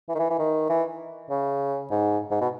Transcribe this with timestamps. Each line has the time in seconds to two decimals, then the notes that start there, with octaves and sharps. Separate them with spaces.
0.09 E3
0.15 D#3
0.19 E3
0.30 E3
0.39 D#3
0.70 E3
1.30 C#3
1.91 G#2
2.31 G#2
2.41 B2